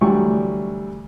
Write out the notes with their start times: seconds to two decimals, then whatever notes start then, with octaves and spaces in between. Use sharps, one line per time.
0.01 D2 E3 F#3 G3 C#6